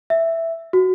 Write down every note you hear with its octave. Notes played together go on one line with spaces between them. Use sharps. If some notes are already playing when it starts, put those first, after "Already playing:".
E5
F#4